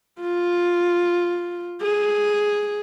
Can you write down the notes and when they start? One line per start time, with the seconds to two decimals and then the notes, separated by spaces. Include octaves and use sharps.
0.21 F4
1.82 G#4